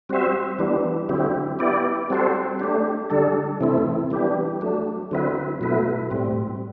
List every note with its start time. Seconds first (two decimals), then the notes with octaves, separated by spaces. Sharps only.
0.09 G3 C4 F#4 C5 E5
0.59 E3 G3 B3 D4
1.09 D3 F#3 C4 E4 G4
1.59 B3 E4 G4 D5
2.10 G3 C4 F#4 A4 C5
2.60 A3 D4 G4
3.10 D3 G3 D4 A4
3.61 C3 E3 A3 C4 E4
4.10 E3 G3 B3 D4 G4
4.61 F#3 A3 D4
5.11 D3 F#3 C4 E4 B4
5.61 B2 F#3 A3 E4 B4
6.10 A2 G3 C4